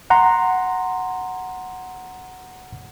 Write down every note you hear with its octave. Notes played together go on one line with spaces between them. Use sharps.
F#5 A#5 C6